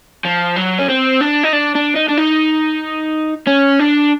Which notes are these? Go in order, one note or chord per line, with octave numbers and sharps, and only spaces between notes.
F3
F#3
C#4
C4
D4
D#4
D4
D4
D#4
D4
D#4
C#4
D4